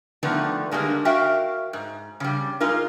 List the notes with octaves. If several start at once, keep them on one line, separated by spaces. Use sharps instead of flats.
D3 D#3 F3 A3 B3 D4
D3 D#3 G3 G#3 A#3
F#4 A#4 E5 F5 G5
G#2
C#3 G3
G#3 D#4 F4 A#4